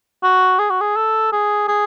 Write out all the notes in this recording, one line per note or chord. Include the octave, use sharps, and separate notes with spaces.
F#4
G#4
F#4
G#4
A4
G#4
G#4